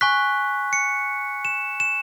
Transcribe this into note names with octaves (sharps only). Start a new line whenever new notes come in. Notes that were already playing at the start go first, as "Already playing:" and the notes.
G#5 C#6 F#6 B6
C#7
E7
E7